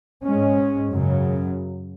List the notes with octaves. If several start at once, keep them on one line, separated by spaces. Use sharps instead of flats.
G#2 G#3 C#4
F#2 C#3 F#3